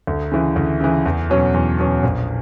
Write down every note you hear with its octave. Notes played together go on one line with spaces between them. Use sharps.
D2
C#3 E3
D2
C#3 E3
E2
B2 F#3 C#4
E2
B2 F#3 C#4
A#1